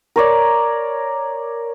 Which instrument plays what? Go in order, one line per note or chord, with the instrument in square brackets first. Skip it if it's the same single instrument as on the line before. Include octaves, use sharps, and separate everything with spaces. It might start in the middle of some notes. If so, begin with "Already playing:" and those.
[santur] A#4 C#5 D5